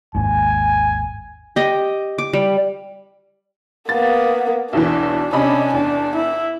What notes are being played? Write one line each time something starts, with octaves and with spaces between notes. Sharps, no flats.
G#1 D#2 G#2 G#5
G4 D#5
D6
G3
A#3 B3 A6
B1 E2 E3 D4
C3 C#4 D4 D#5 B5
E2 D4
E4